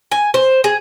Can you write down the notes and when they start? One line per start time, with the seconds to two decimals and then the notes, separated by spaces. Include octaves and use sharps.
0.12 G#5
0.34 C5
0.64 G#4